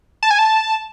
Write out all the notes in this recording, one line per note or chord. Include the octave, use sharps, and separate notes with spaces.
A5
G#5
A5